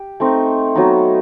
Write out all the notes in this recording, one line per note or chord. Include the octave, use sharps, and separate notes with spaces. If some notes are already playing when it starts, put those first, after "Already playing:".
Already playing: G4
A3 C4 D#4
F#3 B3 D#4